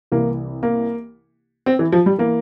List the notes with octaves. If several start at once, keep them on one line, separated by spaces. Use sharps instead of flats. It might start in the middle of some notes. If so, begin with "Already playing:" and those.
C2 C3 E3 A#3
A#3
C4
E3
F3
G3
E3 A#3